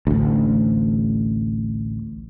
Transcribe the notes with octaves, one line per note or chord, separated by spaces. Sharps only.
A1 D2